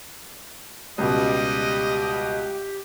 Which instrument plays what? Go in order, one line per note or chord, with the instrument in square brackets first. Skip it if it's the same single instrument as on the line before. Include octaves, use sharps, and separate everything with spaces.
[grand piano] C#2 B2 [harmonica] G3 D#5 [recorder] G4